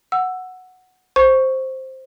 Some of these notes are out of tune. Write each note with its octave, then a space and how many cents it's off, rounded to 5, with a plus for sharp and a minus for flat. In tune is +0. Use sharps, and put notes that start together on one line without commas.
F#5 +0 E6 +10
C5 +5 C#6 +0